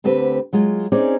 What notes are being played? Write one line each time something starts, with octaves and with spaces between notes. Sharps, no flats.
D2 D3 C4 G4 B4
F#3 G#3 F4
C4 C#4 D#4 G#4 D5